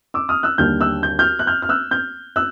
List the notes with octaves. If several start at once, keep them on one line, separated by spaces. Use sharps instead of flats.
D6 E6
D#6 F6
E6 F#6
D#2 D3 G3 F6 G6
E6 F#6
G6
F6 G6
F#6
F6 G6
F6
E6 F#6
F6 G6
E6 F#6